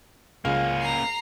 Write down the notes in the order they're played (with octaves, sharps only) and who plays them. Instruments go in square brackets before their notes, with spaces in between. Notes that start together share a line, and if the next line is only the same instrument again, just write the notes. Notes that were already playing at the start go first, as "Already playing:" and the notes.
[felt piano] C#2 [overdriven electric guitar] A#3 C#4 [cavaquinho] F5
[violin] A#5 C7